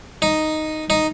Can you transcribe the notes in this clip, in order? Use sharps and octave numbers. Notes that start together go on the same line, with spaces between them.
D#4
D#4